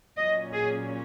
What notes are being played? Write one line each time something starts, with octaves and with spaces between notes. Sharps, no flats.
A#2 F#3 C#4 D#5
G#4